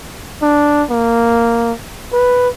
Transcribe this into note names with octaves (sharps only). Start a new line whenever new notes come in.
D4
A#3
B4